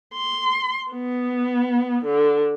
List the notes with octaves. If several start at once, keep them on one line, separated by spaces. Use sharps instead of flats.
C6
B3
D3